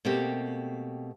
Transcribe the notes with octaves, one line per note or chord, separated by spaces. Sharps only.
B2 A3 A#3 C4 G4